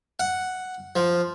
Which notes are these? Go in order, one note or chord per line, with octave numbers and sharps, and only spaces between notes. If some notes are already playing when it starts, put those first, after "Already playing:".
F#5
F3